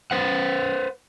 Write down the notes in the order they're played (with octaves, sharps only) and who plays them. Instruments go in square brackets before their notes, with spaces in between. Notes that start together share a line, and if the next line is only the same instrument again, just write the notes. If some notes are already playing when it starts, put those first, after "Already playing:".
[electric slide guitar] B4 C5 F#5